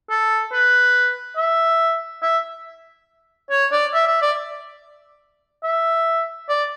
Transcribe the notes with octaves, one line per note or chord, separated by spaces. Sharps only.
A4
B4
E5
E5
C#5
D5
E5
E5
D5
E5
D5